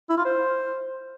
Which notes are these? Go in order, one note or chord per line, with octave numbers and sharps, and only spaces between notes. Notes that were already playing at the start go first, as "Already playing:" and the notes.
E4
F4
C5